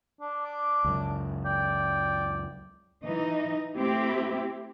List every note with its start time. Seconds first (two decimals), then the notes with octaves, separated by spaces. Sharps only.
0.21 D4
0.45 D6
0.84 C#2 F#2
1.45 D5 G5
3.04 E3 D#4 D#5
3.77 A3 C4 E4 G4